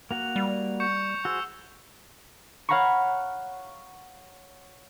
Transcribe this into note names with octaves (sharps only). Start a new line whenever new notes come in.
A#3 F#4 F#5 F7
G3
C#6 G6 C#7
F#4 G#4 C5 E6
C#5 F5 F#5 A#5 B5 C#6